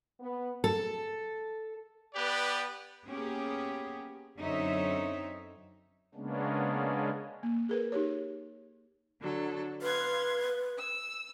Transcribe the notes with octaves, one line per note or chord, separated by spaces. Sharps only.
B3
A4
B3 G4 B4 D5
A#3 B3 C#4 G4 G#4
F#2 D3 C4 D#4 C#5 E5
C#3 G#3 A#3 B3 C#4 D4
A#3
G#4 A#4 B4
D#4 G4 C#5
D3 F#3 A4
B4 F5 C6 G#6
E6